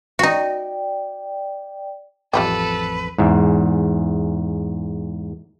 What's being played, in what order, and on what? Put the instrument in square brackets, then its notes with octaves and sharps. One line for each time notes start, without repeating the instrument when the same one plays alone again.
[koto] D#4 F#4 [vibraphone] D5 G5
[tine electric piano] A1 F2 [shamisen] G3 F4 G4 [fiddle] A4 [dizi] B4
[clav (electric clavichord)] E2 G#2